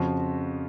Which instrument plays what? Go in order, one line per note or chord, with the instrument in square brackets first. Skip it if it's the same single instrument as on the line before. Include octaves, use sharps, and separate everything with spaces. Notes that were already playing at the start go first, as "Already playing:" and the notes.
Already playing: [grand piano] F2 C#3 F3 F#4